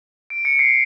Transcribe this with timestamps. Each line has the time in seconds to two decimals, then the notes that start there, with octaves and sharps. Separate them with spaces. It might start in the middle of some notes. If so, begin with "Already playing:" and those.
0.30 D7
0.45 C#7
0.59 C7